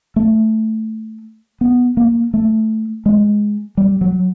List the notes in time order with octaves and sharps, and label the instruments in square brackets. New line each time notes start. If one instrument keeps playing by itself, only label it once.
[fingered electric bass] A3
B3
A#3
A3
G#3
G3
F#3